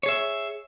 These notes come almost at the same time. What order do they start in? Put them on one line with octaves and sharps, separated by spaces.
C#5 G#4 E5